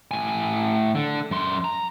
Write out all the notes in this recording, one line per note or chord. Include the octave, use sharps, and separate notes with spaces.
A2 G#5
D3
F#2 C6
A#5